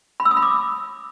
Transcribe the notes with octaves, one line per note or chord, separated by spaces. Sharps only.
B5
E6
D#6
B5
D6